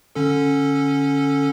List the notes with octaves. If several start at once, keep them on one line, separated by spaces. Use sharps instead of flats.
D3 C#4 A4